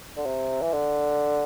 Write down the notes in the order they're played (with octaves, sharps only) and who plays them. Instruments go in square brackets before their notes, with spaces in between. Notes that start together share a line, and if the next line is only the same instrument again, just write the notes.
[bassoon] D3
C3
E3
D3